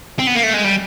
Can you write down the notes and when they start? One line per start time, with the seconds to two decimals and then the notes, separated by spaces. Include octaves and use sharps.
0.19 C4
0.27 B3
0.35 A#3
0.43 A3
0.54 G#3
0.65 G3